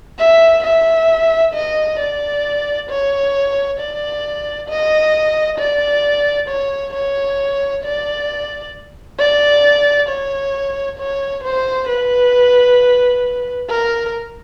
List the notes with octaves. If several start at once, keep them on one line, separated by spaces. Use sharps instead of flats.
E5
E5
D#5
D5
C#5
D5
D#5
D5
C#5
C#5
D5
D5
C#5
C#5
C5
B4
A#4